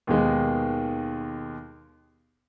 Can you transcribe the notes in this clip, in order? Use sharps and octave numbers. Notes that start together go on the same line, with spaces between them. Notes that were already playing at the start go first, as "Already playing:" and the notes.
D#2 B2 D#3 G#3